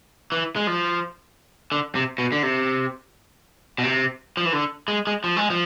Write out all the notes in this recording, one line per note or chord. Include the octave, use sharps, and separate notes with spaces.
E3
G#3
F3
D3
C3
B2
D3
C3
B2
C3
F3
E3
D3
G#3
G#3
F3
G#3
F3